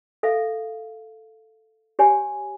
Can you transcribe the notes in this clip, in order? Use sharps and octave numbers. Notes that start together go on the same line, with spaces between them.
A4 E5 F5
G4 C#5 G#5